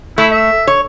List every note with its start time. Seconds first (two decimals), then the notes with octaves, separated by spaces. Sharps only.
0.18 A3 E4
0.32 E5
0.67 C#5